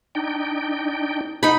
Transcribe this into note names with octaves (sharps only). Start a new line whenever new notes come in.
D4 D#4 G5
D#4 F#5 B5